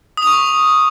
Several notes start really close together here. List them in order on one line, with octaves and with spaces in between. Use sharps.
D#6 F7 C#6